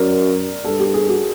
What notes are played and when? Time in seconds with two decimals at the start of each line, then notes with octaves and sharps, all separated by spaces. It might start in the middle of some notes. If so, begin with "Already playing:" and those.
Already playing: F#2 A#4 D5
0.65 G2 A4
0.79 G4
0.94 G#4
1.09 F#4